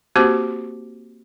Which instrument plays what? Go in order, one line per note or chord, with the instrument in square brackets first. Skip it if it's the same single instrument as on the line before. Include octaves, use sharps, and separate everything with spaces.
[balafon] A#3 C4 F#4 G4 C5 D6